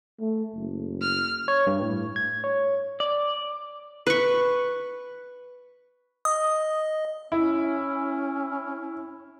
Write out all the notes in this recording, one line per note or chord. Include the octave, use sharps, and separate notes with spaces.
A3
F#1
F6
C#5
G2
A2
G#6
C#5
D5
B4 C#6
D#5 D#6
C#4 E4